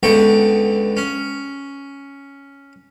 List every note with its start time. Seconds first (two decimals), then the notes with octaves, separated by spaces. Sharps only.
0.03 C#2 D3 B3 G5 C#6
0.97 C#4